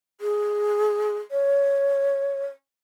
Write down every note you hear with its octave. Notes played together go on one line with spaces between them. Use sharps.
G#4
C#5